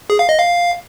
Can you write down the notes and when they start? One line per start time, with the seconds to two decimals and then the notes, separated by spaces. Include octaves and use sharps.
0.10 G#4
0.19 F5
0.29 D#5
0.38 F5